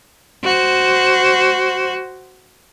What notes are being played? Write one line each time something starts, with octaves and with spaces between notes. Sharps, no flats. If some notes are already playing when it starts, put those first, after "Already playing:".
F#4 C5